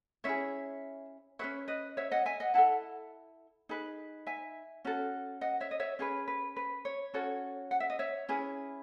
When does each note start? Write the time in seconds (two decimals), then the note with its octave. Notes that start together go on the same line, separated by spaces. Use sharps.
0.24 C#4 E4 G#4 C#5 E5
1.39 C#4 G#4 B4 C#5 E5
1.68 B4 D#5
1.97 C#5 E5
2.11 D#5 F#5
2.26 E5 G#5
2.40 D#5 F#5
2.54 E4 A4 F#5 A5
3.69 D#4 G#4 B4
4.27 E5 G#5
4.85 C#4 F#4 A4
5.41 D#5 F#5
5.60 C#5 E5
5.71 D#5
5.80 C#5 E5
5.99 C#4 G#4 B4 C#5
6.28 B4
6.57 B4
6.85 C#5
7.14 C#4 F#4 A4 C#5
7.71 F#5
7.80 E5
7.90 D#5
7.99 C#5 E5
8.29 C#4 E4 G#4 B4